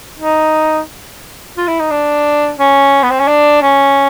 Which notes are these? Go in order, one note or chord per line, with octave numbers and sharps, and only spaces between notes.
D#4
F4
E4
D#4
D4
C#4
B3
C4
C#4
D4
C#4